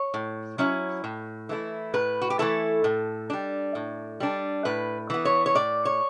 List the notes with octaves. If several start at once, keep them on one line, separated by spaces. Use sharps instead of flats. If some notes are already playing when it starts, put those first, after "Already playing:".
Already playing: C#5
A2
F#3 C#4 E4
A2
E3 A3 E4
A2 B4
F#4
G4
E3 A3 E4 A4
A2
G3 D4
A2
G3 D4
A2 B4
E3 B3
C#5
C#5
A2 D5
C#5